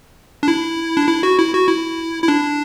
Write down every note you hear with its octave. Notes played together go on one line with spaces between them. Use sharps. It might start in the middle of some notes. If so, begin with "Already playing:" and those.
D4
E4
D4
E4
F#4
E4
F#4
E4
E4
D4